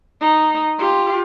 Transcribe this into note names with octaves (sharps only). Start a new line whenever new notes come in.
D#4
F4 G4